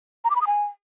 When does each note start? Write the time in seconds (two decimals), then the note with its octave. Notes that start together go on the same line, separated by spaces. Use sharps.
0.24 A#5
0.30 D6
0.36 B5
0.41 D#6
0.47 G#5